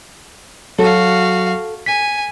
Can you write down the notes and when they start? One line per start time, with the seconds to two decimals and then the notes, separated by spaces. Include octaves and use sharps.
0.79 F#3 F#4 A4 F5
1.86 G#5 B6